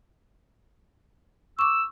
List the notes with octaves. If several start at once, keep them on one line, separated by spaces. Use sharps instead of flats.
C#6 D6 E6